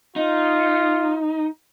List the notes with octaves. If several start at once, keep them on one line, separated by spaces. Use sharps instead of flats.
D#4 F4